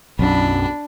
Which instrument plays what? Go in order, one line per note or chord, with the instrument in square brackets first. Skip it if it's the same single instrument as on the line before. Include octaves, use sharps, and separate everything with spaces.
[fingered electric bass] B1 F#2 [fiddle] D4 B5